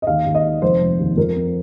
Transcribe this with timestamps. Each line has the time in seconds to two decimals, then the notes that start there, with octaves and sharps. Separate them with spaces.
0.02 D#5
0.07 D#2 F5
0.26 D#2
0.35 D#5
0.44 D#3
0.62 F1 C5
0.80 F1
0.99 D#2
1.17 F2 A#4
1.36 C4